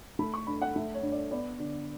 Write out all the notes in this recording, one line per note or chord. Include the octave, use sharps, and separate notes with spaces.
A3 B5
C#6
G2 B5
F#5
A3 E5
C#5
G2
D5
B3 D5
D3